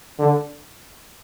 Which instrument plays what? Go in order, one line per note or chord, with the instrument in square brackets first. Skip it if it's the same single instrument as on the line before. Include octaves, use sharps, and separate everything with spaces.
[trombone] D3